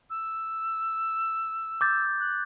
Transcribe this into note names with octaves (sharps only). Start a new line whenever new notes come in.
E6
D6 G6 A6
F#6